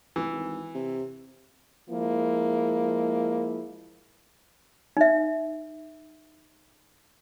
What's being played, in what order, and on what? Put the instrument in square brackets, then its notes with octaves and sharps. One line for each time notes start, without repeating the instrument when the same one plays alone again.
[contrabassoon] F1 [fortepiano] E3
[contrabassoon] G#1
C3
[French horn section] F3 G#3 A#3 E4
[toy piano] D#4 E5